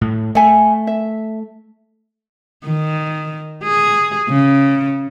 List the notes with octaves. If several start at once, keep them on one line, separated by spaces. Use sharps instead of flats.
A2
A3 E5 G#5
E5
D#3
G#4
C#3